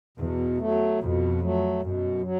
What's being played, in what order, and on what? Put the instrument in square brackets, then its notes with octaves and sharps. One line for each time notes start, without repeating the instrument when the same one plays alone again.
[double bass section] E2 [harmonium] B2
[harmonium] F#3 A3
[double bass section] F2 [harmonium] B2
[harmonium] F#3 A3
[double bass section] F#2 [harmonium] B2
[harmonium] F#3